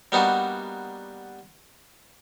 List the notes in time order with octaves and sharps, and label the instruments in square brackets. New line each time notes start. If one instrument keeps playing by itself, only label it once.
[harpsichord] G3 A#3 B3 D4 D#4 F#4